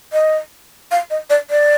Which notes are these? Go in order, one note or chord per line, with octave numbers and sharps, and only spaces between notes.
D#5
F5
D#5
D5
D5